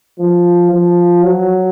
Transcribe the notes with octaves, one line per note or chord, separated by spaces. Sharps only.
F3
F3
F#3